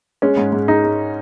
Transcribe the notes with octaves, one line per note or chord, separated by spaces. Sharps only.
G#3 C#4
G#2
G#2
G#3 D#4
G#3